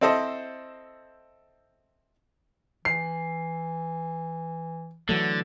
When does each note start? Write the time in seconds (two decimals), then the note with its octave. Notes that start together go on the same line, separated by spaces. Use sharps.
0.01 C4 E4 A4 C5 D#5
2.85 E3 C7
5.09 D3 E3 F#3 A3